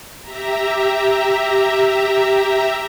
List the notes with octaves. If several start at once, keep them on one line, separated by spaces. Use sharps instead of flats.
G4 E5 A#5